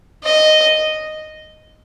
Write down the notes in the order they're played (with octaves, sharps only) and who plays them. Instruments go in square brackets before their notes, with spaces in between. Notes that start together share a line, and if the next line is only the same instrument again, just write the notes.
[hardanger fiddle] D#5